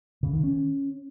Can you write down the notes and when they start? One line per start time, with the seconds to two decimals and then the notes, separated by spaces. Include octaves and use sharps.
0.23 C#3
0.33 D#3
0.44 C#4